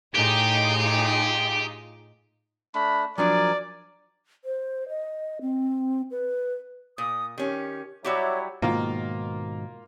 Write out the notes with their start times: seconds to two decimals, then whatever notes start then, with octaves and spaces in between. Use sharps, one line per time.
0.15 A2 D#4 F4 G4 G#4
2.75 A3 D4 B5
3.18 F3 F#3 D4 A#4 D5 G#5
4.45 C5
4.89 D#5
5.41 C4
6.11 B4
6.98 A#2 D#6
7.38 D#3 C#4 G4
8.04 F#3 G3 E4 F#4 G4 C#5
8.62 G#2 B2 D#3 A#3 F4